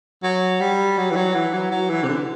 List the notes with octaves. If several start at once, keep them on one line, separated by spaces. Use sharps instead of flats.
F#3
G3
F#3
E3
F#3
E3
F#3
F#3
E3
C3
D3